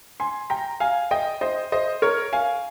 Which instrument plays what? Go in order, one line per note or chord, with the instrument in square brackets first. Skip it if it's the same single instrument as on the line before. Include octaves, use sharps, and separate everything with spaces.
[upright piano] G#5 C6
G5 A#5
F5 G#5
D#5 G5
C5 D#5
C5 D#5
A#4 C#5
F5 G#5